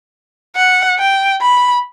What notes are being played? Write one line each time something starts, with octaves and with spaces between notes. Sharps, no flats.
F#5
G5
B5